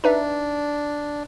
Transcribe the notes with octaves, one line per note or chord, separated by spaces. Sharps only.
D4 D#4 B4 E5